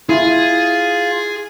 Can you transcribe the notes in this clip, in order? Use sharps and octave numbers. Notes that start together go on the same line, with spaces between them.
E4 F4 G#4